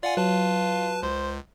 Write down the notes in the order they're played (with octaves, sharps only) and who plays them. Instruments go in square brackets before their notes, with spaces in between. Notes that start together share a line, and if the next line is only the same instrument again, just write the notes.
[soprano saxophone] F4 [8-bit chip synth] D5 F#5 G#5
[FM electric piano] F#3 [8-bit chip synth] B4 A5
[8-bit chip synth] C#2 [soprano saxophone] C5